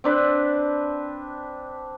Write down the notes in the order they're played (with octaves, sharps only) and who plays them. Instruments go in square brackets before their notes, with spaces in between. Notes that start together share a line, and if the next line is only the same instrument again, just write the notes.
[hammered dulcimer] C4 D4 B4